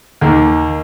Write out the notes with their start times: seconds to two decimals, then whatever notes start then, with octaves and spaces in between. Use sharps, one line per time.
0.21 D#2 A#3